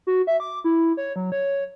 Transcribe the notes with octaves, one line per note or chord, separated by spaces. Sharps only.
F#4
E5
D6
E4
C#5
F#3
C#5